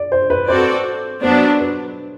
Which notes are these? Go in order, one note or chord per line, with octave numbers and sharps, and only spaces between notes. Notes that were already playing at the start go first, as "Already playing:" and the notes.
Already playing: D5
C5
B4
C4 F#4 A4 C5 D5
F#3 B3 D4 C5
B4